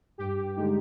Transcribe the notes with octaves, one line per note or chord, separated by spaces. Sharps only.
G2 G4
D3 G#3 D#4 G4